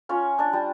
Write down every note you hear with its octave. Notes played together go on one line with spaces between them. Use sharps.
C#4 F4 C#5
D4 D5
G3